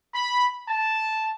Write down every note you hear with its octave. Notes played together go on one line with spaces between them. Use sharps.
B5
A5